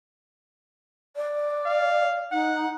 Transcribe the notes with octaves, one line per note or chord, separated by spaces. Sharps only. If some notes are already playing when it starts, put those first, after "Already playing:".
D5
F5
D#4 F#5